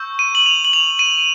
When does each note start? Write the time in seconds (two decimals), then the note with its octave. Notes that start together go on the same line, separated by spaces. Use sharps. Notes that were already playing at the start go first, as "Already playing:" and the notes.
Already playing: C#6 E6 G6
0.19 D#7
0.35 F#7
0.46 F7
0.65 F#7
0.73 F7
0.99 D#7